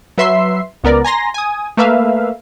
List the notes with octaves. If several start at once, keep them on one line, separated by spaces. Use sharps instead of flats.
F#3 B4 E5 C6 C7
C#2 B3 A#4 D5
G#5 A#5 C6 A#6
G#5 D#6
A3 A#3 B4 E5 F5